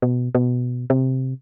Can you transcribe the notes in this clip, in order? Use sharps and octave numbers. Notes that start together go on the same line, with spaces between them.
B2
B2
C3